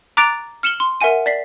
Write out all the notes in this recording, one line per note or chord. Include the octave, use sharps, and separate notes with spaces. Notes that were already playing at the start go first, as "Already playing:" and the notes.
A#5 D6 F#6 A6 D7 F7
F6 C#7 E7 F#7 G7
C6
A#4 E5 F#5 G#5 D#7
D5 B6 C7